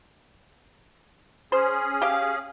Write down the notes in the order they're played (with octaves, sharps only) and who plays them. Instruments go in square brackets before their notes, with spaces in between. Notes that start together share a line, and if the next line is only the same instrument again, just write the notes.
[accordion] C#4 G#4 [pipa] C5
[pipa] G4 F5